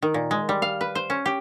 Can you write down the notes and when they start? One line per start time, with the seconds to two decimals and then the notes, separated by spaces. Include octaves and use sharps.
0.02 D#3
0.14 A#2
0.31 G#3
0.49 G3
0.62 F5
0.81 B4
0.95 C5
1.10 C#4
1.26 G4